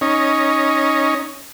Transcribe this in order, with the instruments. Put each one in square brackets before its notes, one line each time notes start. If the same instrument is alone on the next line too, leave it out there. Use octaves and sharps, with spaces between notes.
[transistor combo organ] C#4 D#4